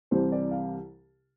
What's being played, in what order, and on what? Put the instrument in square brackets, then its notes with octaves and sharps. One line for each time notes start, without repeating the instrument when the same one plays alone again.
[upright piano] C2 C3 E3 G3 C5
D5
F5